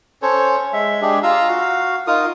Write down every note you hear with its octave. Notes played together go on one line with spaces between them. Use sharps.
C#4 A4 C5 C#5
G#3 E5
G#3 D4 G4 G#4
F4 F5 A#5 E6
F#4 F5
D#4 F4 A#4 D#6